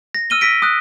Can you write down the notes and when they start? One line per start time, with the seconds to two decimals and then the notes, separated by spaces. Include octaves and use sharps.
0.15 A#6
0.30 E6 F6 D#7 G7
0.41 E6 A#6 B6 D7
0.62 D#6 F#6